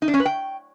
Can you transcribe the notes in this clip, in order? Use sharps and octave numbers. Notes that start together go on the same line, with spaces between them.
D#4
D4
C#4
B4
G5